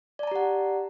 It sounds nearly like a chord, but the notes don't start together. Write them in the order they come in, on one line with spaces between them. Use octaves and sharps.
D5 A5 A#5 G4 F#5